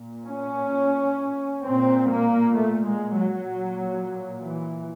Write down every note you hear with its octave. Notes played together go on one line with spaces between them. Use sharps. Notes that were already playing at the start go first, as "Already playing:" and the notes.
Already playing: A#2
C#4
A#2 C4
A#3
A3
G#3
F#3
A#2
E3